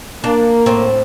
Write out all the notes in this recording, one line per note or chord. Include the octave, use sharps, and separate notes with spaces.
A#3 D4
A2 C4